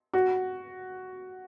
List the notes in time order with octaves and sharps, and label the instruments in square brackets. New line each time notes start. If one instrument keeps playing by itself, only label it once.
[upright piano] F#4